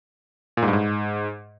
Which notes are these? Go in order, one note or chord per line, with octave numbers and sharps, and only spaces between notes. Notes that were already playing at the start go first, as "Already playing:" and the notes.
A#2
G#2
G2
G#2